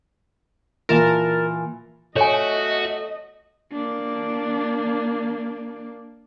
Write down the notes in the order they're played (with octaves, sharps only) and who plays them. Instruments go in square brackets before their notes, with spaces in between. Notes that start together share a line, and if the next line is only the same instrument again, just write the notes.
[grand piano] A#2 E3 F4 [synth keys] A#4 A5
[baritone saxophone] A3 [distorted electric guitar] F#4 [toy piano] C#5 G#5 [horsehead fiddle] D#5
[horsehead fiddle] A#3 D4